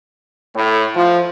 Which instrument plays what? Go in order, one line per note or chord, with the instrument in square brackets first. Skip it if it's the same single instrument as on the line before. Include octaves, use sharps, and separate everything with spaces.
[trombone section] A2
F3